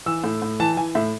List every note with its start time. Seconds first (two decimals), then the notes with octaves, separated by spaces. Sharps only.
0.06 E3 E6
0.24 A2
0.42 A2
0.60 E3 A5
0.73 A5
0.77 E3 G#5
0.95 A2 E5